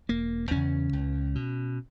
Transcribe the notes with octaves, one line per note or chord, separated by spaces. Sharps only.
E1 A#3
E2 C#3 C#4
C#2
B2